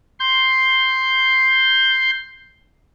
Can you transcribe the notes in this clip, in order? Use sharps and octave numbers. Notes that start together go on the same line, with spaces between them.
C6 G6